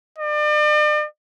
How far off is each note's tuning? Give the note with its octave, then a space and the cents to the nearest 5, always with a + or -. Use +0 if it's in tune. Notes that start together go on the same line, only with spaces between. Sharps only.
D5 +40